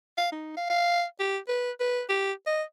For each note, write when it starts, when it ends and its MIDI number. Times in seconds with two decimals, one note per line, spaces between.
0.17 0.28 77
0.32 0.52 63
0.57 0.69 77
0.70 1.04 77
1.20 1.38 67
1.48 1.71 71
1.80 2.02 71
2.09 2.32 67
2.46 2.62 75